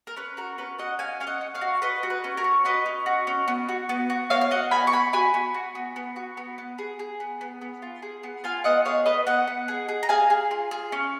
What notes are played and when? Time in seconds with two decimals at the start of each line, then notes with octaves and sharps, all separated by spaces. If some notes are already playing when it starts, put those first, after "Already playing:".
0.07 A#4
0.17 C#4 B4
0.37 F#4 A#4
0.58 C#4 B4
0.79 F#4 D#5 F#5
0.99 C#4 F5 G#5
1.20 C#4 F5
1.27 D#5 F#5
1.41 C#4
1.55 C#5 F5
1.61 F#4
1.82 F#4 B4 D#5
2.03 F#4
2.10 B4
2.24 C#4
2.37 A#4 C#5
2.44 F#4
2.65 F#4 B4 D#5
2.86 C#4
3.06 F#4
3.27 C#4
3.48 B3
3.69 F#4
3.89 B3
4.10 F#4
4.30 B3 C#5 F5
4.41 F5
4.51 F#4 D#5 F#5
4.71 B3 G#5 B5
4.87 C#6
4.92 B3 G#5 B5
5.13 F#4 G#5 B5
5.34 B3
5.54 F#4
5.75 B3
5.96 B3
6.16 F#4
6.37 B3
6.58 B3
6.78 G#4
6.99 G#4
7.20 B3
7.41 B3
7.61 B3
7.82 F4
8.02 G#4
8.23 B3
8.44 F4 F5 G#5
8.64 B3 D#5 F#5
8.85 G#4 C#5 F5
9.06 B3 B4 D#5
9.27 B3 D#5 F#5
9.48 B3
9.68 G#4
9.89 G#4
10.03 A#5
10.09 G#4 F5 G#5
10.30 G#4
10.51 F4
10.71 G#4
10.92 C#4